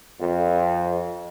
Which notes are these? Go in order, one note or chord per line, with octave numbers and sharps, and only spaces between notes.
F2